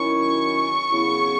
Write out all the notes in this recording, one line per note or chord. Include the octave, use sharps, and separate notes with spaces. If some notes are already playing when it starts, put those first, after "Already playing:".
Already playing: D#3 F#3 C#4 E4 C#6
C#3 F#3 B3 E4